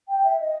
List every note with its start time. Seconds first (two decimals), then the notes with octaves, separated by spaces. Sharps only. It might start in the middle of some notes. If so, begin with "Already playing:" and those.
0.09 G5
0.24 E5
0.40 D#5